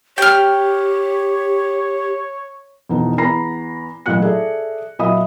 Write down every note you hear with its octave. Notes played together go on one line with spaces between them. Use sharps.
G4 C#5 G5 F6
F2 B2 E3 B3 D#4
E2 B3 A#5 B5 A#6 C7
A1 A#2 F#3 F#4 F#6 C#7
G#4 A4 D5 E5
A#2 F#3 D#5 E5 B5 D#6